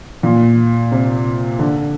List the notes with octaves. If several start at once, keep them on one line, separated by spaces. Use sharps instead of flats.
A#2
C3
D3